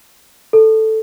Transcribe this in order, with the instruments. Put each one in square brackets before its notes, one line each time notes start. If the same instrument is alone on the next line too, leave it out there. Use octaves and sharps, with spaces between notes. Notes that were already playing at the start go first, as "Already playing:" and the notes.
[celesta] A4